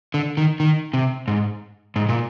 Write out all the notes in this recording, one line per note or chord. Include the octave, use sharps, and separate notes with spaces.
D3
D#3
D#3
C3
G#2
G#2
A#2